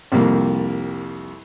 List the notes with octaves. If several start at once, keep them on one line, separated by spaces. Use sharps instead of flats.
C2 F2 G3 A#3